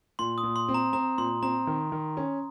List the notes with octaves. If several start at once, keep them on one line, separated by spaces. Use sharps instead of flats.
A#2 C6
D#6
A#2
C6
C4
A#5
C4 A#5
A#2 C6
C4 A#5
D#3
D#3
C#4